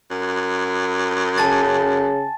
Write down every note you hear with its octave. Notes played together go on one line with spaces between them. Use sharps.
F#2
C#3 G#5 A5 A6